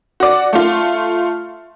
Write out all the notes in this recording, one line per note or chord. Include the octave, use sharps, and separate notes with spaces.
F#4 D5
A3 F4